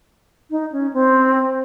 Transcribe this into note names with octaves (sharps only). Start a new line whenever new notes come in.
D#4
C#4
C4